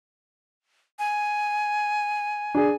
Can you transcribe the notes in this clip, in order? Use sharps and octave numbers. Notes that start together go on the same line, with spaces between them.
G#5
D4 G#4